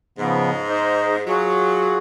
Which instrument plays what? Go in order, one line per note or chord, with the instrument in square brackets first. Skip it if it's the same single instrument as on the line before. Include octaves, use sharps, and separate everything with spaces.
[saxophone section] G#2 [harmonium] C#3 F3 B3
[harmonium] D#4 C5 D#5
[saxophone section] F#3 [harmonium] F4 F#4 G#4